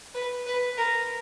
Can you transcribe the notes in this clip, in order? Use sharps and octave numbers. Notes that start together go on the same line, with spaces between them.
B4
B4
A#4